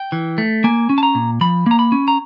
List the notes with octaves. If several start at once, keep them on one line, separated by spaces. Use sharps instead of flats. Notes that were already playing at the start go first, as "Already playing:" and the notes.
Already playing: G5
E3
A3
A#3 G#5
C#4
A5
A#5
A#2
F3 B5
A#3 A#5
B5
C#4
A#5